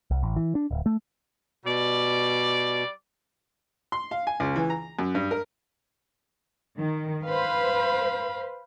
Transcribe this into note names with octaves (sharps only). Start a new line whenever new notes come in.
C2
A1
E3
D4
D1
A3
B2 G3 D5
C6
F5
G#5
C#2
E3
A#5
F#2
G2
A#4
D#3
B4 C5 F5 B5